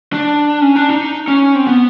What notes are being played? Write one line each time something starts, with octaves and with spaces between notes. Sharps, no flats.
D4
C#4
D4
D#4
C#4
C4
B3